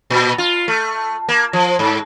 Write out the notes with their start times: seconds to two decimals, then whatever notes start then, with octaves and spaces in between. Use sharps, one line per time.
0.10 A#2
0.38 F4
0.68 A3
1.29 A#3
1.53 F3
1.79 G#2